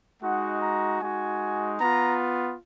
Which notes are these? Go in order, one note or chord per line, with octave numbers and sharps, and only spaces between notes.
G#3 D#4 F#4 F#5
A#5
G#3 D#4 F#4 G#5
B3 F4 A#5